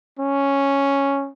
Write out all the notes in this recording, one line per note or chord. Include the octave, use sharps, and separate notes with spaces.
C#4